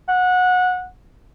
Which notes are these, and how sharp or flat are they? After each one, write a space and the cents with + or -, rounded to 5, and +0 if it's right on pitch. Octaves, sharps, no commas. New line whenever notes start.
F#5 -20